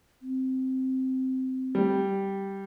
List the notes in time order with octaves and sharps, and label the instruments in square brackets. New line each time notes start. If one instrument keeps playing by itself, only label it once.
[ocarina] C4
[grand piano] G3